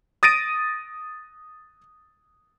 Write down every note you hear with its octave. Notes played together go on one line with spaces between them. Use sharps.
D#6 A6 A#6 D7 D#7